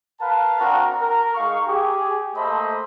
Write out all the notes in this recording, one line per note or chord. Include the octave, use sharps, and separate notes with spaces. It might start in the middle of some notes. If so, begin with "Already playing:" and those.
A#4 B4 F5 A5
C4 D4 F#4 A#4
A#4
G#3 D#4 F5 C#6
G4 G#4
A3 A#3 A4 C5 D#5 B5